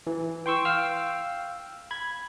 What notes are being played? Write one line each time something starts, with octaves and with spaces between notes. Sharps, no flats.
E3
G5 C6 C#6 E6
F5 G5 E6 F6
B5 G#6